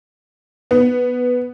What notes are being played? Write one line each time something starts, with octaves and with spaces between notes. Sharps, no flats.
B3